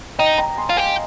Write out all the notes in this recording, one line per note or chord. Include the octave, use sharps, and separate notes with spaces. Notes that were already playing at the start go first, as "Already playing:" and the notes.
D#4 D#5 G5
G5 A#5
G#5 C6
F4
G4 F5 G#5